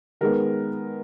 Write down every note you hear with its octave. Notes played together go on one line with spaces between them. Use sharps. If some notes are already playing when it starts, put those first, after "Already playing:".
D#3 G#3 B3 A#4